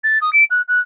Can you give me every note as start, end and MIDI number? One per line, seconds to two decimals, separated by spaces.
0.04 0.19 93
0.21 0.33 87
0.33 0.44 98
0.51 0.62 90
0.68 0.80 90